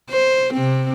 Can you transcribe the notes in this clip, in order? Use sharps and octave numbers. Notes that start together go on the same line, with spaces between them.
C5
C3 C4